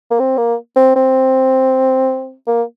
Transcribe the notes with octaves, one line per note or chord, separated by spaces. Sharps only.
A#3
C4
A#3
C4
C4
A#3